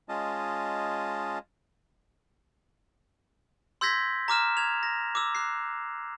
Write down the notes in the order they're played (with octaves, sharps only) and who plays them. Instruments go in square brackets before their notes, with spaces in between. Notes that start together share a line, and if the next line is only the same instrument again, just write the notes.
[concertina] G#3 C#4 F4 D#5 A5
[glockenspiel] C6 E6 G6 G#6 A#6 B6
A#5 D6 F6 E7
G#6 F7
A#6
D6 E6
F#6 C7